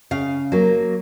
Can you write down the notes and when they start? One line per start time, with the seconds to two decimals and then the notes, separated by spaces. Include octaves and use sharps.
0.11 C#3 F5
0.52 F#3 A#3